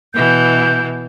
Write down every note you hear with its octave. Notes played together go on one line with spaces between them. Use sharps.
B2 E3 G6